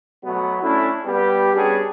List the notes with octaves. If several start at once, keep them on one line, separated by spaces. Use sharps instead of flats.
B2 F#3 A3 B3
A3 C#4 D4 E4
G3 B3 G4
G3 B3 C#4 D4 G#4